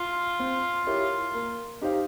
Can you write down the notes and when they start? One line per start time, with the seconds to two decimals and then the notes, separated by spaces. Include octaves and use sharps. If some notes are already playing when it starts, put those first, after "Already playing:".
Already playing: F4
0.39 C4
0.87 E4 G4 A#4 C#5
1.34 A#3
1.82 D#4 G4 C5 F5